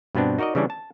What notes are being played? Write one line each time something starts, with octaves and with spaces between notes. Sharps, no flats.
G2 B2 B3 C4 D4
D#4 F#4 A#4 D5 D#5
C#3 E3 G3 C#4 D4
A5